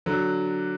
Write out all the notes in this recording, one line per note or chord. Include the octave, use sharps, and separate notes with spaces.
D3 F#3